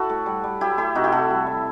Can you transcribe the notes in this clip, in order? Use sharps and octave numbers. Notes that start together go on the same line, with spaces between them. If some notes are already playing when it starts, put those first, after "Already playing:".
Already playing: E4 F#4 A4
A2
G3
G3
F#3 E4 G4
A3 E4 G4
C3 D#4 F#4
E4 G4
C3 F#4 A4
G3
G3